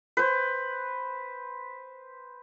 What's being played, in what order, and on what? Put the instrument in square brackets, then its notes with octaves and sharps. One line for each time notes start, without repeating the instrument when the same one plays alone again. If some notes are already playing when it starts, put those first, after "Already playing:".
[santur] B4 C5